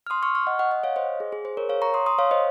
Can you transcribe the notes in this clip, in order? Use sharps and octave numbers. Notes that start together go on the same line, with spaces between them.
F6
C6 D#6
C#6 F6
C#6 F6
D#5 F#5
D#5 F#5
D#5 F#5
C#5 F5
C5 D#5
G#4
G#4
G#4 C5
A#4 C#5
C#5 F5
A#5 C#6
C6 D#6
C6 D#6
C#5 F5
C5 D#5